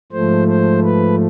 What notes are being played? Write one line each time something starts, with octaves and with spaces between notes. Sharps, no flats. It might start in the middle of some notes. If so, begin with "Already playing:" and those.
G#2 F3 A3 C5
C5
B4